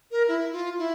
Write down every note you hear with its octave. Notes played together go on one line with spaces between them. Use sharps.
A#4
E4
F4
E4